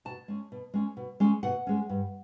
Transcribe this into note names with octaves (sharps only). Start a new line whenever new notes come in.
B2 A5
G#3 C#4
B2
G#3 C#4
B2
G#3 C#4
B2 F#5
G#3 C#4
G2